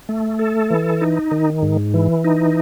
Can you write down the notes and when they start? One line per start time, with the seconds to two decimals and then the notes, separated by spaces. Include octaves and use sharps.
0.09 A3
0.39 A4
0.70 E3
1.01 D#4
1.31 D#3
1.62 G#2
1.94 E3
2.24 D#4